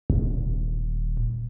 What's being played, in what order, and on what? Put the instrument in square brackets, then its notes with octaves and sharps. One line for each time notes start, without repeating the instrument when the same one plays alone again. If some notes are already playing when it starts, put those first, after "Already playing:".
[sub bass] D#1